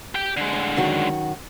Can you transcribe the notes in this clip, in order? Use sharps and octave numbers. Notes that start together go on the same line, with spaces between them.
G4 G5
D3 G#3
A2
F#2 D#3 F#4